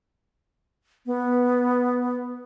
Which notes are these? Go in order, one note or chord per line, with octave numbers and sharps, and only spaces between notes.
B3